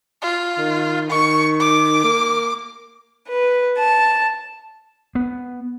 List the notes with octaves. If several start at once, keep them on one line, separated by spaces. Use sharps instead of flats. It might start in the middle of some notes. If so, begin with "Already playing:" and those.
F4
D#3
D#3 C#6
D6
A#3
B4
A5
B3